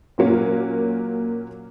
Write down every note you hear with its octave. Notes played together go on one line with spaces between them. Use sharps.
A#2 F#3 A#3 C#4